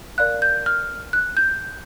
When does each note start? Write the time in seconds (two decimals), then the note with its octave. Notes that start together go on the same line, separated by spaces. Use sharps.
0.18 A#4 D5 F5 F#6
0.42 G6
0.66 F6
1.13 F#6
1.37 G6